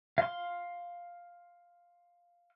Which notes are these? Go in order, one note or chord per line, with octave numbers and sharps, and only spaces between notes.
F5 C6